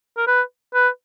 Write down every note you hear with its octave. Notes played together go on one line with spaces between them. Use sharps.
A#4
B4
B4